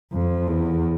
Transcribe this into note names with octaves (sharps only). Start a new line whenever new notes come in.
F2
E2